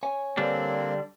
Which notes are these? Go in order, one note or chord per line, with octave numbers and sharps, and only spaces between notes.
C#5 G#5
D3 G3 A#3 C4 D4